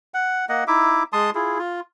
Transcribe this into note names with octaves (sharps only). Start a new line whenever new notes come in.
F#5
A#3 D#5 F#5
D#4 E4 E5 D6
G#3 A5 C6 D#6
E4 F4 G#4
F4